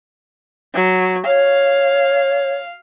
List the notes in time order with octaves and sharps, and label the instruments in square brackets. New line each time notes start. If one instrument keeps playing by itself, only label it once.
[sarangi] F#3
[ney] C#5 [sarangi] F5